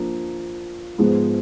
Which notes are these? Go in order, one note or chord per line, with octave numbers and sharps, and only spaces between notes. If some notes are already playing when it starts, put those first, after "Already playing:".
Already playing: F3 A#3 D4
G#2 F3 G#3 B3